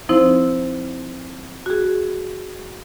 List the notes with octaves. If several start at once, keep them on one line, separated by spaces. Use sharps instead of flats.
F3 C4 D#4 E4 C5
F#4 G#4